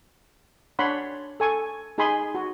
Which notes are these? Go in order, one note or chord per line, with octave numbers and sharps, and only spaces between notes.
D4 C#5 F#5 B5 C6
A4 G#5 C#6
D#4 G#4 G#5 B5 C6
F#4